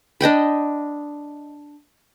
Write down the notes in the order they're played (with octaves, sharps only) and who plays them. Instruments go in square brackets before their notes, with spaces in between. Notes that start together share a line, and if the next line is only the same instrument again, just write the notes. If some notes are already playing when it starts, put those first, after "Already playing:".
[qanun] D4 D#5 G5 B5